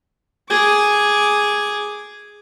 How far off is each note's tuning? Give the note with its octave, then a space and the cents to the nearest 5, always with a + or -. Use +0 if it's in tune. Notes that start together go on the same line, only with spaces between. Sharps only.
G#4 +0 D6 +0